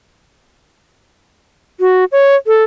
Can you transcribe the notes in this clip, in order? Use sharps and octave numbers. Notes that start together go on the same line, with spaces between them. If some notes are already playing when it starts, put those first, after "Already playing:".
F#4
C#5
A4